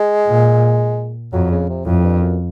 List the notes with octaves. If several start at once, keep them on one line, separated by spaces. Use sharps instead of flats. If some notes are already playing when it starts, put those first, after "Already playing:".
Already playing: G#3
A#2
F2 F#3
C#3
C3
F2 A2
G2
F#2